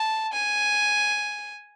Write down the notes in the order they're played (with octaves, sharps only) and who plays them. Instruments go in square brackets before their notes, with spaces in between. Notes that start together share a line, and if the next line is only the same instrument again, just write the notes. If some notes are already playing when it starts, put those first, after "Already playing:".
Already playing: [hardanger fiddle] A5
G#5